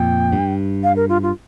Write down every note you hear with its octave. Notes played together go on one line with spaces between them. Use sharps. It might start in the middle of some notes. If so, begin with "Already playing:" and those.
Already playing: F2 A#2 G5
G2
F5
A#4
F4
F4